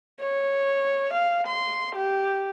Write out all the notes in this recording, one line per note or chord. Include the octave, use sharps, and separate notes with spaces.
C#5
F5
C6
G4